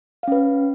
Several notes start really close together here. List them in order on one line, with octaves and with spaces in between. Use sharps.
F5 C#4 B4